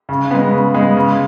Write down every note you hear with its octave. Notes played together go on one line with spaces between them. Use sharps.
C#3
G#3 B3
C#3
G#3 B3
C#3